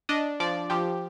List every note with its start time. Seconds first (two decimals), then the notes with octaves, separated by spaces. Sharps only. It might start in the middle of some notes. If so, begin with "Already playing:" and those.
0.09 D4 D#5
0.40 F3 D5
0.70 F3 G4